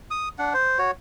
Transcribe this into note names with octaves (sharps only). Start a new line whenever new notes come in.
D#6
D4 F#5
C5
F#4 C#5